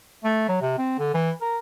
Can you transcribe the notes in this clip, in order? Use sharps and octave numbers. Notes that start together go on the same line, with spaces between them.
A3
F#3
C3
C4
D3
E3
A#4